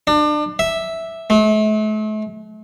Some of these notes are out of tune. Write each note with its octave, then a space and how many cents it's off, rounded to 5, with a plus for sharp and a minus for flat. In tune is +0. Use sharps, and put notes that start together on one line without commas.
D4 +30
E5 -5
A3 -40